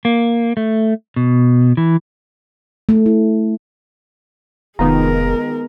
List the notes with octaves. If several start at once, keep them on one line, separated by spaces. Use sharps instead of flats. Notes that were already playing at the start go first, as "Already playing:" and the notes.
A#3
A3
B2
E3
A3
E4
F1 D#3 G#3 B3 D#4 F4 A#4 A#5